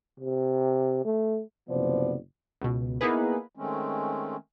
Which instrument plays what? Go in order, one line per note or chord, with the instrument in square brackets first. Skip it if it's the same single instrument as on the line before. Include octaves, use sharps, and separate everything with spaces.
[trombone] C3
A3
[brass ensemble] F#1 C3 F3 B3 C5 D5
[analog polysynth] C#2 B2
A#3 B3 D#4 E4 G#4 B4
[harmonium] D#3 G#3 A3 C4 C#4